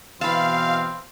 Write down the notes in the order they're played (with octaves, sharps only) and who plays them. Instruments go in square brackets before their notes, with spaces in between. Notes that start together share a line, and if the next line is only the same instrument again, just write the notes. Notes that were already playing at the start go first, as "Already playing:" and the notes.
[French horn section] B2 E3 [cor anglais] C4 [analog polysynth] F5 [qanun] A5 B5